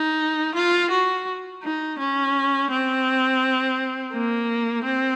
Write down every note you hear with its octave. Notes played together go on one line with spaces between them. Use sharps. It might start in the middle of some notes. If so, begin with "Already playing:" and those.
Already playing: D#4
F4
F#4
D#4
C#4
C4
A#3
C4